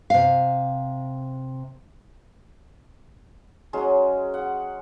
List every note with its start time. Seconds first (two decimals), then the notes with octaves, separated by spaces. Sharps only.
0.10 C3 F5
3.73 F#3 G#3 C#4 C6
4.34 F#5